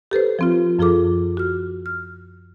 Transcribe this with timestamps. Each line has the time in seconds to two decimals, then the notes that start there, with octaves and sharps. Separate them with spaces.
0.11 G4 A4 B4 C5
0.39 F3 C4 F4
0.79 F#2 F3 F4 G#4 A4 D6
1.37 F#4 F6
1.86 F6